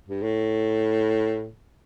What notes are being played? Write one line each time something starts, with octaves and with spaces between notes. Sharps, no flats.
G2
A2